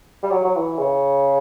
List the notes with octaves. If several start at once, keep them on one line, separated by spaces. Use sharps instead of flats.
G3
F#3
F#3
E3
C#3